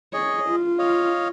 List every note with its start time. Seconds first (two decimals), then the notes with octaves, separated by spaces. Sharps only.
0.13 G#4 C#5 D#5
0.49 F4
0.79 C#5 D#5 F5